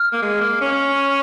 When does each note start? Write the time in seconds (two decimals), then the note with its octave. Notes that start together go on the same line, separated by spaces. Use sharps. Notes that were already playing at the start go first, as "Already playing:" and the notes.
Already playing: F6
0.13 A#3
0.22 G#3
0.41 A#3
0.61 C#4